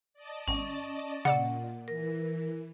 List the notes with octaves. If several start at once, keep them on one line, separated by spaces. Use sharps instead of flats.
D5 D#5 A5
G#1 C#4
A#2 C#3 D5 F#5 E6
E3 A#4